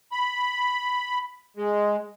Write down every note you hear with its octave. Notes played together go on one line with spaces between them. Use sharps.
B5
G#3